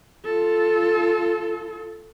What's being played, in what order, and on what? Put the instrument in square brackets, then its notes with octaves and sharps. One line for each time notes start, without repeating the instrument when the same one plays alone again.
[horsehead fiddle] F4 A4